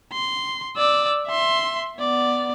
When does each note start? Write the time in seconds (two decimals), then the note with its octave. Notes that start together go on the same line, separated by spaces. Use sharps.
0.12 C6
0.77 D5 E6
1.27 E5 C6
1.98 B3 D5